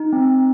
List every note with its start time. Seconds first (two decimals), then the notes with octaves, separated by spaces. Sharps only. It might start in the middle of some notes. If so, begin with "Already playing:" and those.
Already playing: D#4
0.13 C4